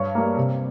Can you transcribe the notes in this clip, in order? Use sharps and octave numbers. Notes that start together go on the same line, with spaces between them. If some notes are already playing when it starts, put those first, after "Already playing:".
Already playing: G2 C#5 C#6
G3 A#3
C3